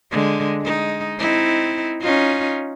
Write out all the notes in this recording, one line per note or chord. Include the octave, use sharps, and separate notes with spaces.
D3 G#3
G#3 D#4
C4 D#4 E4
C#4 D#4 F4